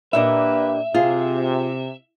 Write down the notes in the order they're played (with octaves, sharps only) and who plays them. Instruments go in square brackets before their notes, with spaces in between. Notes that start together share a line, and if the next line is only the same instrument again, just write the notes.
[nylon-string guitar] A#2 D4 D#5 [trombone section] A#3 G4 B4 [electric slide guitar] E5
[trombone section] C3 [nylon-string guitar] F4 G#4